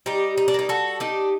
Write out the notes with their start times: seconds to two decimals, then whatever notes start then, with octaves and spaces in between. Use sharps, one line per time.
0.06 G3 D#4 G4
0.38 D#4
0.48 D4
0.54 A#3 D#4
0.69 F#4 A4
1.00 D4 D#4 G4